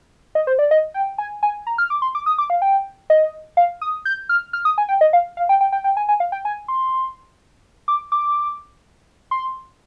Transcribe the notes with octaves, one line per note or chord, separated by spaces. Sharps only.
D#5
C5
D5
D#5
G5
G#5
G#5
A#5
F6
D6
C6
D6
D#6
D6
F5
G5
D#5
F5
D#6
G6
F6
F6
D#6
G#5
G5
D#5
F5
F5
G5
G5
G5
G5
G#5
G#5
F5
G5
G#5
C6
D6
D6
C6